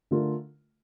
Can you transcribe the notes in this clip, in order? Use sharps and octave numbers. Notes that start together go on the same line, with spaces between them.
D3 A3 D4 F4 A#4